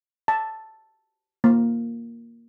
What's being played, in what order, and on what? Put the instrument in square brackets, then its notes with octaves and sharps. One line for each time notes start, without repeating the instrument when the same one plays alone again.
[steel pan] A5
A#3